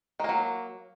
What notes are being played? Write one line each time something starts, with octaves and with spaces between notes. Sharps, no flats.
D#3 F#3 A#3